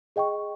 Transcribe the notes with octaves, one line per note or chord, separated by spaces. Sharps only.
G#4 D#5 G5 C#6